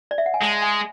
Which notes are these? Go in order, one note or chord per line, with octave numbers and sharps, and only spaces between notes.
D5
E5
F#5
G#5
G#3 A5
G#5